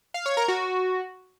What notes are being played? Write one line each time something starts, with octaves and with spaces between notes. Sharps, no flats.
F5
C#5
A#4
F#4